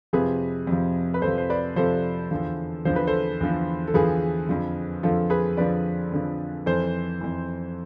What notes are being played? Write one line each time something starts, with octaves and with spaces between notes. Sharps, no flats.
F2 C3 F3 G#4 B4
F2 C3 F3
B4
F2 C3 F3 A4 C5
C5
B4 D5
F2 C3 F3 A4 C5
E2 D3 F3
E2 D3 F3 C5
B4
A4 C5
E2 D3 F3
A4
E2 D3 F3 G#4 B4
F2 D3 F3
F2 D3 F3 F4 A4
G#4 B4
F2 D3 F3 B4 D5
F2 D3 F3
F2 E3 A4 C5
F2 E3